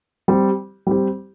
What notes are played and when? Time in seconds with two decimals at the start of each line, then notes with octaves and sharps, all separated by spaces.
0.28 G3 C4 G4
0.87 G3 C4 G4